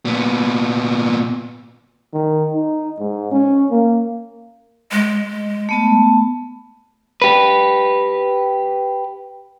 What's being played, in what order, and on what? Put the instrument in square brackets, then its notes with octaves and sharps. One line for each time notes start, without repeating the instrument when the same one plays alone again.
[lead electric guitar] A#2 B3
[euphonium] D#3
D#4
G#2
C#4
A#3
[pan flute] G#3
[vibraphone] A3 B3 A5
[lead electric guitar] G4 B4